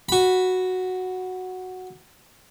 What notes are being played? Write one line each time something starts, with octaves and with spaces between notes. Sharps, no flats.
F#4 B5